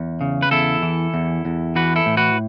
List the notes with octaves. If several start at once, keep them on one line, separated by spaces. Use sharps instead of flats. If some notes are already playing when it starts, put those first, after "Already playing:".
Already playing: E2
C#3
B4
E2 E4 A4
E3
E2
E2
E3 F#4 B4
E4 A4
A2
F#4 B4